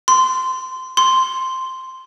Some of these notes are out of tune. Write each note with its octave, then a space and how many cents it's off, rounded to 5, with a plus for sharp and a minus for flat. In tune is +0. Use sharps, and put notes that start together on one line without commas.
C6 -15
C6 -5